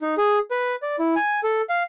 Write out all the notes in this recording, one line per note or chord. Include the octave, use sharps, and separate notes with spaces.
D#4
G#4
B4
D5
E4
G#5
A4
F5